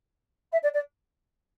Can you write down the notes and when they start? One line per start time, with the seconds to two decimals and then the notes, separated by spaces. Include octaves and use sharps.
0.52 E5
0.63 D5
0.74 D5